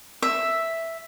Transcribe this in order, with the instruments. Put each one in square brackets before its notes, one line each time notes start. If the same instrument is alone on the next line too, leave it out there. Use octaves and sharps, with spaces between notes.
[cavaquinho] E5